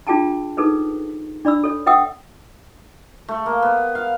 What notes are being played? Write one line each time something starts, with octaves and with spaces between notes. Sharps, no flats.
D4 F4 G#4 G5 A5 A#5
D#4 G#4 A4 B4 C5
D4 D5 B5 E6
A4 C#5
B4 E5 F#5 G5 D#6 E6
A3
A#3
B3
F5